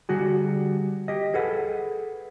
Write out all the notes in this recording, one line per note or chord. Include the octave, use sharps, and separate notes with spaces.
D3 G3 F#4 G#4
G4 D#5
G#4 A4 B4 F#5